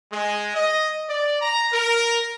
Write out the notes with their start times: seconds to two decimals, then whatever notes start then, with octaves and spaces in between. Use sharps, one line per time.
0.12 G#3
0.54 D#5
1.09 D5
1.41 A#5
1.72 A#4